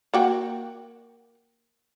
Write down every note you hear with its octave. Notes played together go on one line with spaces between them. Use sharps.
A#3 F#4 G5